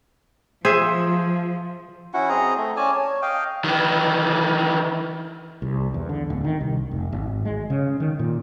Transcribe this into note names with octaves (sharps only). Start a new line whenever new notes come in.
F3 G#4 C5 E5
C#4 E4 F#4 F#5
C4 G#4 D#5 A#5
A3
C#4 D5 G#5 A5
C#5
D#5 F5 G5
D#3 E3
C2
E2
D3
D1
D#3
C2
F1
G#1
G#3
C#3
D#3
A#2